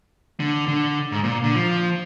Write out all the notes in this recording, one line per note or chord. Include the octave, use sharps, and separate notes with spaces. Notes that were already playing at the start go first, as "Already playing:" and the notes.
D3
D3
G#2
A#2
D3
F3